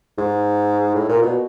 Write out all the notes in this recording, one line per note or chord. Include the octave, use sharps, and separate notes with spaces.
G#2
A2
A#2
B2